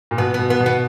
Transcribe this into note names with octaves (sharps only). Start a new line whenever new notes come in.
A#2
B2 B3
B3
B2
B3
B2
B3